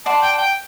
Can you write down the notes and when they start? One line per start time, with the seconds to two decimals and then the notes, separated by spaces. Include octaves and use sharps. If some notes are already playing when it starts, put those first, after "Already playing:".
0.06 D5 F#5 A5 C6
0.22 G5
0.32 A5
0.38 G5